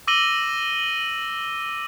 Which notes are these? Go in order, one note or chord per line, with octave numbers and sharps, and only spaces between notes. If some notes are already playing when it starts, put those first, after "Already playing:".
D6 E6 A#6 D#7 F#7 G7